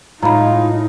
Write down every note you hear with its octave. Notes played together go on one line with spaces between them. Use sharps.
A2 G#3 A3 D#4 F4 A#5 B5